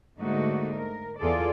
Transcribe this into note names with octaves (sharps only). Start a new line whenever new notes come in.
G#2 D3 A3 A#3 D#4 F#4
A#4
E2 F4 G#4 A4 D5